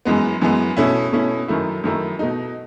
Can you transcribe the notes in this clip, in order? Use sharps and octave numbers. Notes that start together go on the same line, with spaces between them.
F#2 E3 G#3 B3
F#2 E3 G#3 B3
B2 A3 C#4 E4
B2 A3 C#4 E4
F#2 D#3 A3 E4
F#2 D#3 A3 E4
B2 A3 D#4